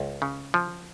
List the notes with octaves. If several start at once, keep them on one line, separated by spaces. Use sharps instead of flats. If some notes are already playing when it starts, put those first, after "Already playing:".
Already playing: C#2
C#3
F3